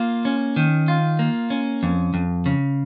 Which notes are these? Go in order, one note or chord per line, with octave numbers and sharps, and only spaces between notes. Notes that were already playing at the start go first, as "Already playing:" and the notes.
Already playing: A#3 F4
C#4
D#3
F4
A#3
C#4
F2
F2
C#3